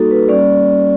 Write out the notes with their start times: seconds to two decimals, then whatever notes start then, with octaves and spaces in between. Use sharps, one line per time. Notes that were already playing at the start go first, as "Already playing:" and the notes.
Already playing: G3 A#3 D#4 F#4 A4
0.11 B4
0.29 G3 A#3 C#4 D5